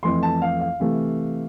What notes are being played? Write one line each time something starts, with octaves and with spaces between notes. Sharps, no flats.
F2 E3 A3 C6
A5
F5
F5
C3 E3 A3